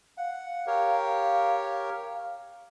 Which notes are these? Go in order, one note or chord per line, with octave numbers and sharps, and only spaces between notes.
F5 F#5
G4 A#4 C#5